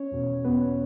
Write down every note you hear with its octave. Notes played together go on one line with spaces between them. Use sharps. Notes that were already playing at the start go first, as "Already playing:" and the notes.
Already playing: C#4 C#5
E2 B2
E2 B2 B3 B4